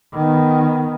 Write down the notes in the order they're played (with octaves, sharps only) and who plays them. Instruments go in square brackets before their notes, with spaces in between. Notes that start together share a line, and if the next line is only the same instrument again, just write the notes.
[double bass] D#3 B3